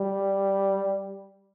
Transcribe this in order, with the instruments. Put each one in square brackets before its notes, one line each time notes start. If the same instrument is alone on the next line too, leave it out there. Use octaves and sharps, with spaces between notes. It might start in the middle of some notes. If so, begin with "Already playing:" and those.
Already playing: [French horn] G3